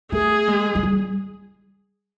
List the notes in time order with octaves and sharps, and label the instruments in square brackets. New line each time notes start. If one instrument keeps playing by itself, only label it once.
[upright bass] A3 [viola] G#4
[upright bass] G#3
G#3
G3